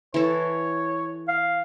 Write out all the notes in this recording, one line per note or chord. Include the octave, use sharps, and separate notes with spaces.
E3 A4 C#5
F5